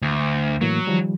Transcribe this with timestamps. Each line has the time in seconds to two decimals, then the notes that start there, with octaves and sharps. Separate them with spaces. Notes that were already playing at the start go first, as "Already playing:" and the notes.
0.02 D2
0.61 A2 E3 F#3 A#3
0.87 D#3 F3 G3